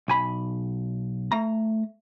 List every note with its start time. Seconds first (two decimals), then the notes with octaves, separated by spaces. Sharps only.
0.08 B1 G#5 B5
1.32 A3 A#5